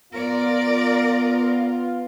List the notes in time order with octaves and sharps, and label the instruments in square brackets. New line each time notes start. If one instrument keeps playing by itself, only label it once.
[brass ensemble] B3 F4 [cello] A#4 D5